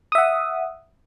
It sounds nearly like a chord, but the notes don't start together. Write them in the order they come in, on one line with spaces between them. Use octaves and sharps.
D#6 E5 F#5